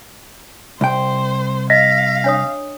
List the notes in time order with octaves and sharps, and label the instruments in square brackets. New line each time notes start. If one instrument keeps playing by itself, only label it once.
[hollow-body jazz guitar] C2 G5 [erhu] C5
[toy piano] D#5 [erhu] F5 [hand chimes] A#6 B6
[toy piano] D4 C#5 D#6